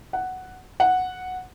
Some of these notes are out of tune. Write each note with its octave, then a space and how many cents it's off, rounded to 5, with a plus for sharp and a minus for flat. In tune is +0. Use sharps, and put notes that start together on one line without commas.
F#5 +5
F#5 -5